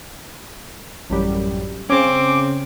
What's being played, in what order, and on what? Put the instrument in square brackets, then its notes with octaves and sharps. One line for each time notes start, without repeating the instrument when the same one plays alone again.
[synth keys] A1 F#2 G3
[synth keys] C#3 C#4 [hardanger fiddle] C4 [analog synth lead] D6